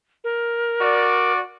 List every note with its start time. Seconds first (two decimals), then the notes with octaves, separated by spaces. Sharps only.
0.24 A#4
0.80 F#4 D5